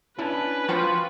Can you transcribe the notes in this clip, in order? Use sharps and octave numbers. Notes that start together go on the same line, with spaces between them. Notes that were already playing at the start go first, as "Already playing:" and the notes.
C#4 D4 E4 B4
F3 F4 F#4 C5 G5